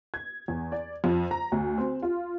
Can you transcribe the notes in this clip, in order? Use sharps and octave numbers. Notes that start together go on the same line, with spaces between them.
G#6
E2
D5
F2
A#5
D2
C4
F4